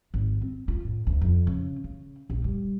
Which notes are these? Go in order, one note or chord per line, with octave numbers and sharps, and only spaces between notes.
G#1
C4
F4
A2
D2
F2
C#3
C#3
A#1
G3